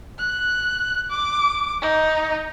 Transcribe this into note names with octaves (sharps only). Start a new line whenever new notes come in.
F#6
D6
D#4